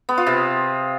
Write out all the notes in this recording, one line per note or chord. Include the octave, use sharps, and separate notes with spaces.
B3
F4
C3